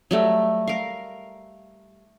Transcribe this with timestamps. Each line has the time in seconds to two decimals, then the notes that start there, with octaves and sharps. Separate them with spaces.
0.11 F#3 G3 A3
0.67 A#4 F5